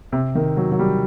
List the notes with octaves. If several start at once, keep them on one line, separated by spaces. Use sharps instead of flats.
C3
D#3
F#3
F#3
G3